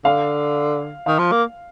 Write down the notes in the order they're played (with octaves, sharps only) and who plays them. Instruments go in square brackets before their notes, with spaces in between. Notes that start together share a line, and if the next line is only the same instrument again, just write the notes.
[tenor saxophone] D3 [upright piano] F5
[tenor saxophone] D#3 [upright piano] F5
[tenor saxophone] F3
A#3